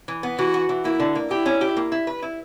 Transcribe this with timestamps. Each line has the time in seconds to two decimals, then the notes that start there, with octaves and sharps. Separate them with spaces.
0.08 E3
0.23 B3
0.39 E3 F#4
0.54 F#4
0.69 E3
0.84 A#3 E4
1.00 D3
1.15 A#3
1.31 E4 G4
1.46 C#4
1.61 G4
1.77 A#3
1.92 E4
2.07 B4
2.22 E4